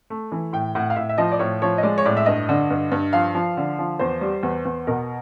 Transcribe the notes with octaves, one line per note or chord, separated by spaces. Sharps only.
A3
E3
A2 G5
A2 F#5
F5
A2 E5
E5
F3 D#5
D5
A2 C#5
F3 C#5
D#5
G#3 D5
C#5
A2 D5
E5
G2 D#5
D3
G2
G2
F3 F5
F3
D3
F3
E2 C5
G3
E2
E2
B2 A#4